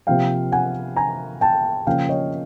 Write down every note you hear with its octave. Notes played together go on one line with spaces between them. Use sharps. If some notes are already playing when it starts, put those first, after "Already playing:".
C3 F3 A#3 F5 G5
F#5 G#5
G#5 A#5
G5 A5
C#3 F3 A#3 C#4 F5 G5
C#5 D#5